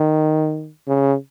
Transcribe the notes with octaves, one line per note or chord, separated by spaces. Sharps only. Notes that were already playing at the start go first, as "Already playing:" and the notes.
Already playing: D#3
C#3